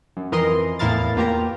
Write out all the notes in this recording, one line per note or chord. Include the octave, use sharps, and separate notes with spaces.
F#2
F2 E3 A#4 D#5 C6
E2 A2 E4 A#4 F5 A6
E2 A#3 F4 G4 A#4 A#5